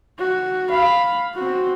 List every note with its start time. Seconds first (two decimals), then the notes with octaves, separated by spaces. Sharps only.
0.19 F#4
0.70 F5 B5
1.36 C4 F#4